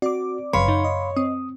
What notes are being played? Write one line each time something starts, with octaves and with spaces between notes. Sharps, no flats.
C4 F#4 D5 D6
G1 F#2 C#3 B4 C#5 F5 B5 C6
F#2 D#4
D#5
C4 D#6